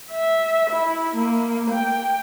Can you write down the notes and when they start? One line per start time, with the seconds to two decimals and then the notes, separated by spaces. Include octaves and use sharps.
0.11 E5
0.70 E4
1.15 A#3
1.70 G5